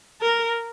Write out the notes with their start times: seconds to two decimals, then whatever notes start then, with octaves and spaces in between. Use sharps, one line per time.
0.21 A#4